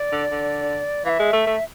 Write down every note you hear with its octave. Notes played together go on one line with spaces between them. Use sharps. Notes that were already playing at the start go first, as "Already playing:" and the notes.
Already playing: D5
D3
D3
E3 E5 F5
G#3
A3
A3